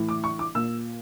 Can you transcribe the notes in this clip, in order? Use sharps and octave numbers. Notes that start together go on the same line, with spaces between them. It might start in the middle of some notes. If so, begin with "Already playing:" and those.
Already playing: A2 E3
D6
C#6
D6
A#2 E6